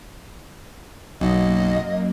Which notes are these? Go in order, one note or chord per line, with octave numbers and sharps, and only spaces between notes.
B1 F#2 A#3 D#5